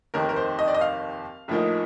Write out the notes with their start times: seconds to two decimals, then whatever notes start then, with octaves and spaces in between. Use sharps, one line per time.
0.14 F1 D#2 D#3 A#4
0.29 A#4
0.36 C5
0.59 D#5
0.68 D5
0.74 D#5
0.81 F5
1.48 A#1 A2 F3 A#3 D#4